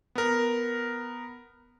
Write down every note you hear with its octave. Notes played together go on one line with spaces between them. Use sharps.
B3 A#4